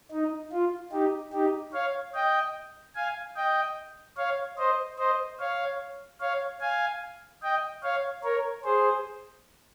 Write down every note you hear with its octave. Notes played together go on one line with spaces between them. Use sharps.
D#4
F4
D#4 G4
D#4 G4
C#5 F5
D#5 G5
F5 G#5
D#5 G5
C#5 F5
C5 D#5
C5 D#5
C#5 F5
C#5 F5
F5 G#5
D#5 G5
C#5 F5
A#4 C#5
G#4 C5